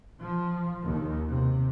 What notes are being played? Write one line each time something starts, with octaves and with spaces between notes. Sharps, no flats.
F3
D#2
C3